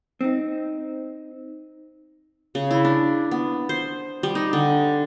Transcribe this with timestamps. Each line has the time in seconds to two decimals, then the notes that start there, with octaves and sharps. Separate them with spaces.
0.21 C4 D#4
2.55 C#3
2.71 E4
2.85 D4
3.31 B3
3.69 C5
4.23 G3
4.35 D#4
4.53 D3